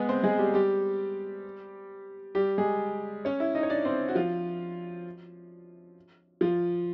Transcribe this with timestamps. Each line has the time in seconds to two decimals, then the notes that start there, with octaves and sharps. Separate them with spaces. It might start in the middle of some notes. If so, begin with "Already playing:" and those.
Already playing: G#3 B3 G#4 B4
0.09 C4 C5
0.24 G#3 G#4
0.39 G3 G4
0.54 G3 G4
2.35 G3 G4
2.58 G#3 G#4
3.25 C#4 C#5
3.40 E4 E5
3.55 D#4 D#5
3.63 C#5
3.70 D4 D5
3.85 C4 C5
4.09 F#4
4.15 F3 F4
6.41 F3 F4